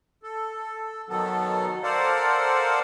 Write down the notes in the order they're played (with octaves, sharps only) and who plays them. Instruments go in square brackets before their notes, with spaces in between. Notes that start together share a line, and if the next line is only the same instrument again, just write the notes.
[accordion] A4
B2 D#3 F#3 B3 A4
A4 A#4 C5 D5 F5 F#5